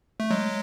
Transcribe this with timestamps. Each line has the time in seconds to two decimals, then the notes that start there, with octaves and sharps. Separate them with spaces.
0.20 A3
0.30 F#3 G#3